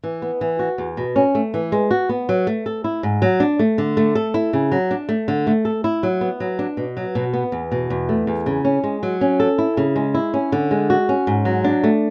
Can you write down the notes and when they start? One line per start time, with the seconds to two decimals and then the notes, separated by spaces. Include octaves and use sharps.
0.03 E3
0.22 B3
0.41 E3
0.59 F#4
0.78 E2
0.97 B2
1.16 C#4
1.35 A3
1.54 E3
1.72 G#3
1.91 F#4
2.09 B3
2.29 F#3
2.47 A3
2.66 A4
2.84 E4
3.03 G#2
3.22 F#3
3.40 D4
3.59 A3
3.78 D3
3.97 A3
4.15 A4
4.34 E4
4.53 C#3
4.72 F#3
4.91 D4
5.09 A3
5.28 D3
5.47 A3
5.65 A4
5.84 E4
6.03 F#3
6.21 B3
6.40 F#3
6.59 D4
6.77 B2
6.97 F#3
7.15 B2
7.33 B3
7.52 E2
7.72 B2
7.90 E2
8.09 A3
8.27 E2
8.46 C#3
8.65 C#4
8.84 G#3
9.03 F#3
9.21 C#4
9.40 A4
9.58 E4
9.77 C#3
9.96 G#3
10.14 E4
10.34 C#4
10.52 D3
10.71 G#3
10.90 F#4
11.09 C#4
11.27 G#2
11.45 F#3
11.64 D4
11.84 A3